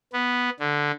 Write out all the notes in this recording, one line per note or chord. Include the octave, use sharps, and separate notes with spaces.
B3
D3